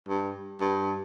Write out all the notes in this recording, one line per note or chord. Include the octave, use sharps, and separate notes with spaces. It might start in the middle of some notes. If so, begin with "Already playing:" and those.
G2
G2